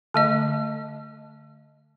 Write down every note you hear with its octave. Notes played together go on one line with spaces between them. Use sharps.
D3 A3 D#5